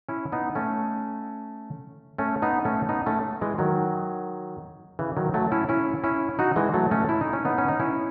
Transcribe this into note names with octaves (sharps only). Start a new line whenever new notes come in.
C#4 E4
B3 D#4
A3 C#4
A3 C#4
B3 D#4
A3 C#4
B3 D#4
A3 C#4
E3 G#3
D#3 F#3
C#3 E3
D#3 F#3
F#3 A3
C#4 E4
C#4 E4
C#4 E4
D#4 F#4
E3 G#3
F#3 A3
A3 C#4
E4
D#4
C#4
B3 D#4
C#4
D#4
C#4 E4